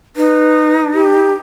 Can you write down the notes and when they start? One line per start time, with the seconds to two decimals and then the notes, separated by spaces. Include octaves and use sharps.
0.16 D#4 B4
0.94 G4